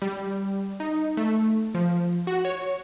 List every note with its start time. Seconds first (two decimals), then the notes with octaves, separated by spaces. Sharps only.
0.02 G3
0.80 D#4
1.17 A3
1.74 F3
2.27 F#4
2.45 C#5